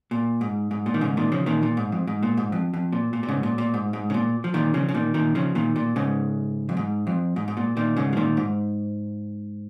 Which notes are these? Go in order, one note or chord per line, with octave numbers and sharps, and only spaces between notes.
A#2
G#2
G#2
A#2
D#3
G#2 C#3
A#2 D#3
C#3 F3
A#2 D#3
A#2
G#2
F2
G#2
A#2
G#2
F2
F2
A#2
A#2
A#2
G#2 C#3
A#2
A#2
G#2
G#2
C#3
A#2
F3
A#2 D#3
C#3 F3
C#3
A#2 D#3
A#2 D#3
C#3 F3
A#2 D#3
A#2
G#2 C#3
F2
G#2
F2
G#2
G#2
A#2
A#2 D#3
G#2 C#3
F3
A#2 D#3
G#2